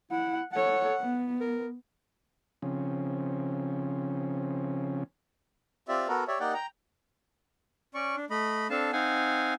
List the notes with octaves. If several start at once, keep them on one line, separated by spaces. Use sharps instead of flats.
E4 F#5
A4 C#5 F#5
B3
A#4
C#3 F3 C4 C#4
C4 F4 G4 D5 E5
B3 F#4 A4 A#4
G4 C#5 D5 E5
A#3 D#4 G4 D5 F#5 G5
G5 A#5
C#4 D5 C#6
D4
A3 D#5 B5
C4 D4 A4 F5 A5
C4 D#4 F5 F#5 G#5